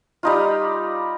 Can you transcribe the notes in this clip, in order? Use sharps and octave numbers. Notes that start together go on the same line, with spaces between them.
G3 D#4 F4